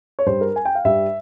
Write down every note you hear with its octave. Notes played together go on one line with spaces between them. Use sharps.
C#5
G2 G3 C5
A#4
G#5
G5
F5
G2 G3 E5